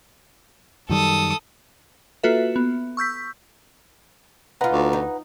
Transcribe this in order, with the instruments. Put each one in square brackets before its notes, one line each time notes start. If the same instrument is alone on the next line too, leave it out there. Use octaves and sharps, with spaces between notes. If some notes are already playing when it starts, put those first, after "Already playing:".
[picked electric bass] F#2 D#3 G3 [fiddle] A4 D#6
[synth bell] A#3 F4 F#4 A4 B4 E5
B3
C#6 E6 G6 B6
[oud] D#4 F4 [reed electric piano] B4 F#5 A#5
[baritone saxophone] D2
[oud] D#4